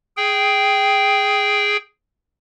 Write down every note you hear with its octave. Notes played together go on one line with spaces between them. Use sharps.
G#4 G5